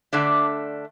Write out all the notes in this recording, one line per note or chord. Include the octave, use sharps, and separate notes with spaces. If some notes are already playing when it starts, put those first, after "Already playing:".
D3 A3 D4 D5